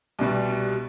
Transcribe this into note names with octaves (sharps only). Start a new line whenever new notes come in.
C2 B2 G3